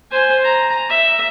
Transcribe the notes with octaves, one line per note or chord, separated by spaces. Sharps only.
C5 G#5
A#5
E5